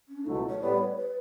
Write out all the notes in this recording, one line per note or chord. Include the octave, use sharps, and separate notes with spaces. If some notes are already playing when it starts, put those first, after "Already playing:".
C#4
D4
C#2 B2 F#3 A3 E4
C#5
A2 G3 B3 D5
C#5
B4